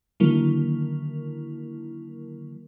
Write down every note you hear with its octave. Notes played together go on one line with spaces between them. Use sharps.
D3 D#3 F#3 A#3 E4 A#4